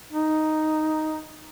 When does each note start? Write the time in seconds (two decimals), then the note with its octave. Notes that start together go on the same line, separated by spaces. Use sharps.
0.12 D#4